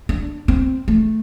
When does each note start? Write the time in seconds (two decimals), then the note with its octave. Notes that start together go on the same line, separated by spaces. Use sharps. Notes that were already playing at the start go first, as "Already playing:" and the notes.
0.09 D4
0.48 C4
0.88 A3